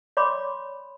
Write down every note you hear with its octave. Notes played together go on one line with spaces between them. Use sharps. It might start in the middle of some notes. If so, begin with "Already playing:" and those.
C#5 D5 B5 C6 D6